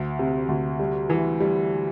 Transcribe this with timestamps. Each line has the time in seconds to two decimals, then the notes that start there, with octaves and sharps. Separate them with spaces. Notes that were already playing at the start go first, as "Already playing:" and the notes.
Already playing: D2
0.19 C3
0.48 D2
0.80 G3
1.10 E3
1.40 G3